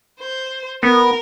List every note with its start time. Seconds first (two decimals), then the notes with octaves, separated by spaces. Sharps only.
0.20 C5
0.83 B3 A#4